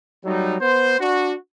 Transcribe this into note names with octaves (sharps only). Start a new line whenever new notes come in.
F#3 G3 A3 D#4
B3 C5
D4 F#4